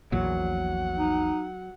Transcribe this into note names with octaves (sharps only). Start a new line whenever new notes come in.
A#1 E2 A#2 F#3 F#5
D#4